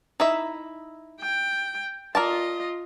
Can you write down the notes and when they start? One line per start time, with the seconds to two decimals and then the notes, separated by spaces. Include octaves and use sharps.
0.20 D#4 E4 E5
1.21 G5
2.15 F4 A#4 D5 D#5 A5